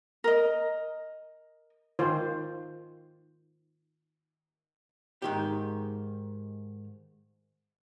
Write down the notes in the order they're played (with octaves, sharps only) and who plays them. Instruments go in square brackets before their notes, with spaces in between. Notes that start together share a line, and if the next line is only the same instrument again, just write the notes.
[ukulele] A#4 D#5
[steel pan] D#3 F4 C5
[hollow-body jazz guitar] G#2 D#3 G4